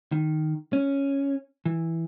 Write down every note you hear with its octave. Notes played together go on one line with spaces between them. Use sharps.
D#3
C#4
E3